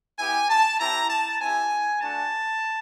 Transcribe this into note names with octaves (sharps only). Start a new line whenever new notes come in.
B3 E4 G4 G#5
A5
C4 E4 G4 A#5
A5
C4 E4 G4 G#5
A3 D4 F#4 A5